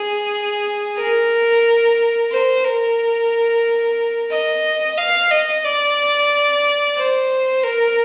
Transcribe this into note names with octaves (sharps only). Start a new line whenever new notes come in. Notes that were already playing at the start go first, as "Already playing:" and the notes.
Already playing: G#4
A#4
C5
A#4
D#5
F5
D#5
D5
C5
A#4